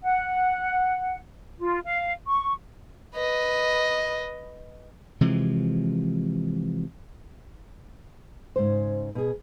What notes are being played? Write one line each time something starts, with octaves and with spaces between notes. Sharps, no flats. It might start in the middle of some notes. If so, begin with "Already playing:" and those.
F#5
F4
F5
C#6
B4 D#5
C3 E3 F3 G#3
G#2 C#3 C5
B2 G#4